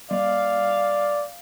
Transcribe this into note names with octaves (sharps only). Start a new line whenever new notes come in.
G3 D5 F5